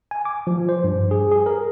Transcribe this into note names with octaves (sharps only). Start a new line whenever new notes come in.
G#5
D6
F3
C5
G2
G#4
G#4
A#4